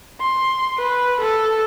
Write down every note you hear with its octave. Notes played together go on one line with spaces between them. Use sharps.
C6
B4
A4